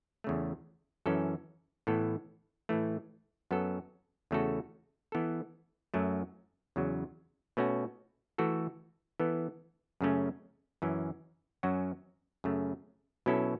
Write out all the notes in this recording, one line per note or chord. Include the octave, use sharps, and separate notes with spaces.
E2 C#3 A3
F#2 E3 C#4 A4
A2 E3 B3 A4
A2 E3 A3
F#2 F#3 B3 A4
E2 C#3 A3 F#4 A4
E3 B3 A4
F#2 F#3 A3
E2 C#3 F#3
B2 A3 C#4 F#4
E3 A3 F#4 A4
E3 B3 A4
F#2 C#3 A3 C#4
F#2 E3 C#4
F#2 F#3 C#4 F#4
F#2 C#3 A3
B2 F#3 C#4 E4 A4